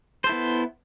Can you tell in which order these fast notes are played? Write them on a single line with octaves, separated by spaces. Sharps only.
C5 A4 E4 B3